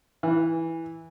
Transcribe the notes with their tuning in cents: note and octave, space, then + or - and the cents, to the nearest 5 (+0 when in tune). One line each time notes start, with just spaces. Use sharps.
E3 -10